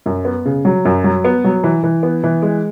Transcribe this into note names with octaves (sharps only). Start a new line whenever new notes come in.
F#2
B3
C#3
F#3
F#2
F#3
B3
F#3
E3
E3
B3
E3
G#3